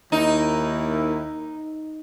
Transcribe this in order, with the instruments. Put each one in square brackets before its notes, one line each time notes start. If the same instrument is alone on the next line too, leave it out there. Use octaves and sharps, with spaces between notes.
[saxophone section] D#2 E4 A#4 [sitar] D#4